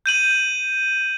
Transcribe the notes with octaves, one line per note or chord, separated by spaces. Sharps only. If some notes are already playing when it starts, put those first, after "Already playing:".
G6 D#7 F#7